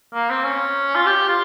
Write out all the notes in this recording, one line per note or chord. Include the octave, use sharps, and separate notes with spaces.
A#3
C4
C#4
F4
G4
F4